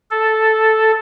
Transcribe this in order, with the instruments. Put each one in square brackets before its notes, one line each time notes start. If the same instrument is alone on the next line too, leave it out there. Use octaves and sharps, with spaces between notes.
[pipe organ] A4